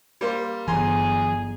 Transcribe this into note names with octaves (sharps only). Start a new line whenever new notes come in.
G3 A#3 C5
G1 E3 F#3 G#4 G#5 A#5 C6